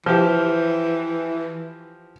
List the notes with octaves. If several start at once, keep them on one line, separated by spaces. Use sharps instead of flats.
E3 F3 G4